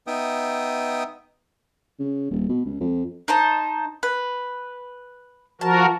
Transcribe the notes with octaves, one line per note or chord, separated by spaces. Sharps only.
B3 D#4 E5 G5 D#6
C#3
D#1
B2
C#2
F2
D#4 C5 A5
B4
F3 F#4 A#4 A5